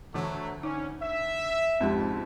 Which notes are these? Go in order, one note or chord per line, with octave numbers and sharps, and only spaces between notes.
D2 E3 F#3 A3
C#4 D#4 D5
E5
F2 G#2 C#3 F3 G#3 G4